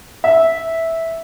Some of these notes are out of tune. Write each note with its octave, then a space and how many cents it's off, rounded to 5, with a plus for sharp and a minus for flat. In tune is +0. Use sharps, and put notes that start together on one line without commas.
E5 -10